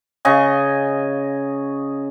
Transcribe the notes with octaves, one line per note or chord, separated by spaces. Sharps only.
C#3 D#5 G#5 C#6